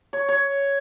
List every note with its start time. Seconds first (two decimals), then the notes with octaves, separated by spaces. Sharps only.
0.13 C#5
0.29 C#5